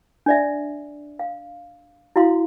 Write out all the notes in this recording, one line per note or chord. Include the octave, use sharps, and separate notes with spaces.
D4 D5 E5
F5
E4 F#4 F5 C6